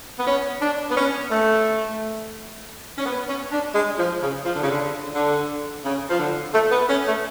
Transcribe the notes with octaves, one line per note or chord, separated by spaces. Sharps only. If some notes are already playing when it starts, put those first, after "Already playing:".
B3
C#4
D4
B3
C#4
A3
C#4
B3
C#4
D4
G#3
F3
C#3
F3
D3
C#3
D3
D3
C#3
F3
D3
A3
B3
C#4
A3